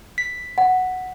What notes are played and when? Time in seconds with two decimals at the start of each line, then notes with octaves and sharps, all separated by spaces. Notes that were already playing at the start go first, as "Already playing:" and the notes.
0.18 B6
0.58 F#5